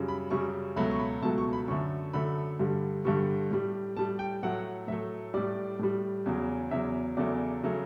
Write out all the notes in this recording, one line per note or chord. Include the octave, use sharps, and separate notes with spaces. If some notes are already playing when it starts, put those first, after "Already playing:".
Already playing: F#2 C#3 G3
B5
F#2 C#3 G3 C#6
C#2 B2 F#3 A3 B5
C#6
B5
C#2 B2 F#3 A3 A5
C#6
B5
F#2 D3 A3 C#6
F#2 D3 A3 B5
G2 D3 G3
G2 D3 G3 C#6
A2 G3
A2 G3 A5
G5
A2 F#3 A3 F#5
A2 F#3 A3 E5
A2 G3 D5
A2 G3
E2 C#3 F#3
E2 C#3 F#3 E5
E2 C#3 F#3 A3 D5
C#3 F#3 A3